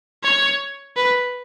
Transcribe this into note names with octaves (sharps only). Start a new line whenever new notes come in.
C#5
B4